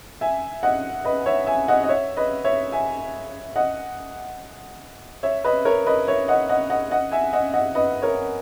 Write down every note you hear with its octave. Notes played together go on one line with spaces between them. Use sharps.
E5 G#5
D#5 F#5
B4 D#5
C#5 E5
E5 G#5
D#5 F#5
D#5
C#5 E5
B4 D#5
C#5 E5
E5 G#5
D#5 F#5
C#5 E5
B4 D#5
A#4 C#5
B4 D#5
C#5 E5
D#5 F#5
D#5 F#5
D#5 F#5
D#5 F#5
E5 G#5
D#5 F#5
D#5 F#5
B4 D#5
A#4 C#5